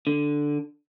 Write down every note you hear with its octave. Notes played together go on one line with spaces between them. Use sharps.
D3